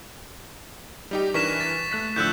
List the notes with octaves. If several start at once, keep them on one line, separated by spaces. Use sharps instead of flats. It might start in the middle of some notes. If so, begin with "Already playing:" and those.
G3 D#4 G4
E3 D4 A#4 C#6 B6 E7
A6
A3 F#6 B6
A2 D3 F3 E6 F#6 G6